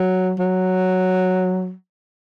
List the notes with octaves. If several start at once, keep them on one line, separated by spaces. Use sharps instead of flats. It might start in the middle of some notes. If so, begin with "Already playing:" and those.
Already playing: F#3
F#3